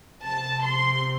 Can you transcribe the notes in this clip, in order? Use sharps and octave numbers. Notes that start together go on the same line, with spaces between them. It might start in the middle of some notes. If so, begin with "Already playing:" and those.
C3 F3 C4 A5
C6